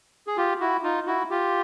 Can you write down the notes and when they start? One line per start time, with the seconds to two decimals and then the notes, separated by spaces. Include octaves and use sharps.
0.27 G#4
0.37 F4 G4
0.60 E4 F#4
0.83 D#4 F4
1.06 E4 F#4
1.30 F4 G4